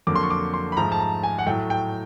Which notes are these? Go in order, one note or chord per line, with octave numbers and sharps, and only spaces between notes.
F2 D3 F#3 A#3 D6
C6
C#6
D6
C6
B5
G#2 F3 A3 A#5
A5
A#5
G#5
F#5
A2 F#3 A3 G5
G5